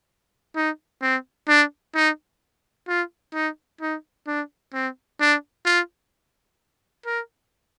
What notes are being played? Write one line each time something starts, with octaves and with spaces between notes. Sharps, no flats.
D#4
C4
D4
D#4
F4
D#4
D#4
D4
C4
D4
F4
A#4